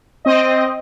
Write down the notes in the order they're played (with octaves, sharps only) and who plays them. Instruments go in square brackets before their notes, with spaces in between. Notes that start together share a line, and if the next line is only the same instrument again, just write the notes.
[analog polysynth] C4 D#5